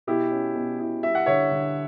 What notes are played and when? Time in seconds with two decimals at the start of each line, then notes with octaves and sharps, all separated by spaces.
0.07 B2 E4 G4
0.31 C#4
0.55 B2
0.80 E4
1.03 G3 E5
1.15 F#5
1.26 D3 C#5 E5
1.51 D3